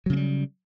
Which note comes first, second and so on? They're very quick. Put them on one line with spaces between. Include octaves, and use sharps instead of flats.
F#3 C#3 A#3 G3